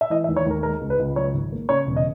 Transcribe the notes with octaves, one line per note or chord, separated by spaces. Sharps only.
E5
E3 D#5
E5
D#2
C#5
D#2 A#4
G#3 A#4
C#2
B4
C#2
F#3 C#5
G#1
A#3
C#3 C#5
E1
D#5